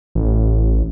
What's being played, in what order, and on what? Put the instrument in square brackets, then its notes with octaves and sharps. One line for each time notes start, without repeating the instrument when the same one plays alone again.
[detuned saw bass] A1